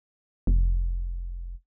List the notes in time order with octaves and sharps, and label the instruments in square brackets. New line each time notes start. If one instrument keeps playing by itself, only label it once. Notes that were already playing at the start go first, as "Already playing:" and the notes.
[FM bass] F1